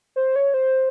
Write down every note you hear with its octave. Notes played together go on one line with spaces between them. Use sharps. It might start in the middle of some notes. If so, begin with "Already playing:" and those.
C5
C#5
C5